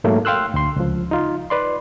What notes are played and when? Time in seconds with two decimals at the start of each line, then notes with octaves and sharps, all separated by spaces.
0.04 G#2 F#3 A3 A#3
0.25 F5 G5 C6 E6 F#6
0.54 D2 C6
0.76 C#2 F3
1.11 D#4 F4
1.50 B4 D5 C6